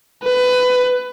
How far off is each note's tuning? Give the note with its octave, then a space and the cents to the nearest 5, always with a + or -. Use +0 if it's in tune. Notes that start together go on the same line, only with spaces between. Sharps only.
B4 +20